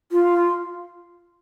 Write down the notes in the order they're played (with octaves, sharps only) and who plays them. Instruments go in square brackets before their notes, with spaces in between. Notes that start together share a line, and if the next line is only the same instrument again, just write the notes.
[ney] F4